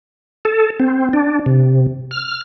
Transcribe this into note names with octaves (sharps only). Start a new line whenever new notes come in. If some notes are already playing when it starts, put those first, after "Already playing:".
A4
C4
D4
C3
F6